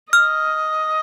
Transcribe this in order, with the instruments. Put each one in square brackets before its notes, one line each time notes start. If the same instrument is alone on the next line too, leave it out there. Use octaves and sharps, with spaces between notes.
[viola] D#5 [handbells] F6